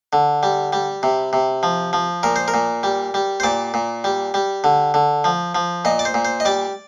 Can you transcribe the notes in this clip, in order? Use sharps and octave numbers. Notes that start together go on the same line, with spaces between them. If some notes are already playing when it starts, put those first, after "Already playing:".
D3
G3
G3
C3
C3
F3
F3
A#2 A#4
C5
A#4
A#2
G3
G3
C5
A#2 D5
A#2
G3
G3
D3
D3
F3
F3
A#2 D#5
D5
C5
A#2
C5
D#5
G3 D5